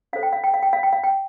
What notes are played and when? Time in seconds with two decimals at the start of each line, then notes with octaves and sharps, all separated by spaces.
0.13 D4 A4 C5 F5
0.23 G5
0.33 F5
0.44 G5
0.54 F5
0.63 G5
0.73 F5
0.83 G5
0.93 F5
1.04 G5